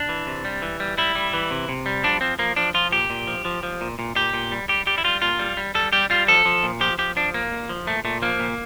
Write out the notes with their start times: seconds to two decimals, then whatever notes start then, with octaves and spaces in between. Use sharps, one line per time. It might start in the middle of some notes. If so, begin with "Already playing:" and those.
Already playing: D4
0.09 E3
0.27 C3
0.45 G3
0.62 E3
0.80 G3
0.98 G3 E4
1.15 G3
1.33 E3
1.51 C3
1.69 C3
1.86 G3
2.04 F3 D4
2.21 F3 C4
2.39 F3 A#3
2.56 F3 D4
2.74 F3 F4
2.92 A#2 G4
3.10 A#2
3.27 F3
3.45 F3
3.63 F3
3.81 A#2
3.99 A#2
4.16 A#2 G4
4.34 A#2
4.52 G3
4.68 G3 G4
4.86 G3 G4
4.98 E4
5.04 G3 F4
5.22 A#2 F4
5.39 G3
5.57 G3
5.75 G3 A4
5.93 G3 G4
6.10 G3 F4
6.28 F3 A4
6.45 F3
6.63 A#2
6.81 F3 G4
6.98 F3 G4
7.16 F3 D4
7.34 A#2 A#3
7.52 A#2
7.69 F3
7.87 A#2 A3
8.05 A#2 A3
8.22 F3 A#3
8.40 A#2